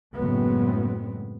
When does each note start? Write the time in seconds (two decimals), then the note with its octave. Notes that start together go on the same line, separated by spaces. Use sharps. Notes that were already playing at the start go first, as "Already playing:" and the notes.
0.15 F#1 A2 F#3 G#3 B3 C4